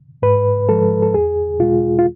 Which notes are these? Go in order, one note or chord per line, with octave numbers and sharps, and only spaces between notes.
G#2 B4
F3 G#3 A4
A4
E2 G#4
B2 G#3 F4
F4